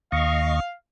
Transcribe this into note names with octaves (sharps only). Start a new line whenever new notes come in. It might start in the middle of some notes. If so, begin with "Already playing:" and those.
D#2 D#5 F5 C#6